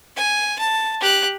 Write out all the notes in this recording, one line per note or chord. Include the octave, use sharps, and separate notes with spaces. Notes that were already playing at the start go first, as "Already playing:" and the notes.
G#5
A5
G4 F#6